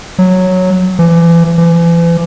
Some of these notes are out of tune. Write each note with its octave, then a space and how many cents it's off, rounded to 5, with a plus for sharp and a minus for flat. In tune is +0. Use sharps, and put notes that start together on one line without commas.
F#3 -5
E3 +35
E3 +40